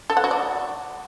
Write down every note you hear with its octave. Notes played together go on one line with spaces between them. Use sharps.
A4
F#5
F#4
D5